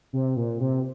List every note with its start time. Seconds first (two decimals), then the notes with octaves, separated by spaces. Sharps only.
0.13 C3
0.37 A#2
0.61 C3